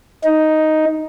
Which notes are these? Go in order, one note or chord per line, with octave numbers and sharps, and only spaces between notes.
D#4